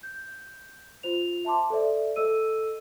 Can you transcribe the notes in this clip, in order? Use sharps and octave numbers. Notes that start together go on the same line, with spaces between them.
G6
F4 C5 F7
E5 A5 C6 D6
A4 C5 D5 E5
A4 D#5 E6 D#7